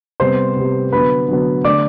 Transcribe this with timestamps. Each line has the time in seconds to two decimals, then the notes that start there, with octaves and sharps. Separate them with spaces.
0.20 C3 G3 B3 C5 C6
0.56 C3 G3 B3
0.92 D3 F#3 B3 B4 B5
1.28 D3 F#3 B3
1.65 D3 A3 D5 D6